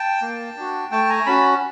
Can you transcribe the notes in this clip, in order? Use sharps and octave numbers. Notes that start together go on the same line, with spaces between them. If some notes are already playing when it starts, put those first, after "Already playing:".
Already playing: G5 A5
A#3
D4 F#4
A3 G5 A5
G#5 A#5
C#4 F#4 A5 B5